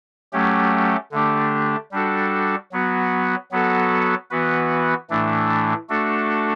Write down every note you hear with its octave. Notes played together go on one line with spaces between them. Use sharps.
F#3 A3 C#4 G4
D3 A3 D4 G4
G3 D4 F#4 A4
F#3 B3 F#4
F#3 B3 F#4 A4
E3 B3 F#4 B4
A2 E3 A3 D4
A3 D4 F#4 A4